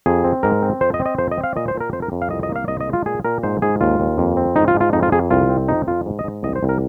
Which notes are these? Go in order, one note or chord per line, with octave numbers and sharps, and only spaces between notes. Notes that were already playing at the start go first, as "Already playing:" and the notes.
F2 G#4
C4
G#2 A#4
C4
F2 C5
D#5
C4
D#5
F2 C5
D#5
C4
F5
A#2 D#5
C5
A#2
A#4
F2 C5
A#4
F2
F5
C2 D#5
D#5
A#3
F5
C2 D#5
D#5
G#3
F4
A#2 G#4
A#2 A#4
G#2 C5
G#2 G#4
D#2 F4
D#2
F2
C4
G#2 D#4
F4
G#2
F4
F2 D#4
F4
F2 G#4
C2 F4
C4
F2 D#4
F2 F4
G#2
D#5
G#2
C2 D#5
C5
C2
A#4